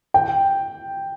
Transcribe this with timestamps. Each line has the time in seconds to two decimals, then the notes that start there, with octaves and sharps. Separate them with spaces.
0.14 G5